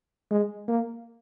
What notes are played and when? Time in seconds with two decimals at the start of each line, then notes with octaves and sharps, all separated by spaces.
0.31 G#3
0.68 A#3